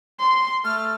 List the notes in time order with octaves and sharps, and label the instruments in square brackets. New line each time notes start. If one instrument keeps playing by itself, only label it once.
[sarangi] C6
[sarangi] A3 [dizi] F6